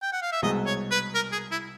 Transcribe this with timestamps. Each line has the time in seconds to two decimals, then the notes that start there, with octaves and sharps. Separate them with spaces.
0.02 G5
0.12 F#5
0.21 F5
0.32 E5
0.42 C2 B2 G#3 D#5
0.66 C#5
0.91 B4
1.15 A#4
1.32 G#4
1.51 E4